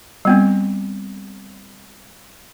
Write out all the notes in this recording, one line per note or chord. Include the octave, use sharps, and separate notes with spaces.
G3 B3 C4